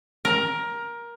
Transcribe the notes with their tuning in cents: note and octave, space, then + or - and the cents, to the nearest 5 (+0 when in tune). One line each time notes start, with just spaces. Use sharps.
A#4 +15